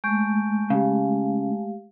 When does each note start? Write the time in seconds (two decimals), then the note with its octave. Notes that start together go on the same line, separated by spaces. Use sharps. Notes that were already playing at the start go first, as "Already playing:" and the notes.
0.04 G#3 A3 C#6 G6 D7
0.70 C#3 G4 F5